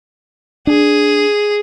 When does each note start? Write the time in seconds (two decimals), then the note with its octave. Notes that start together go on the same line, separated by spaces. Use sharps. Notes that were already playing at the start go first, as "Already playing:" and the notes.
0.67 D4 G#4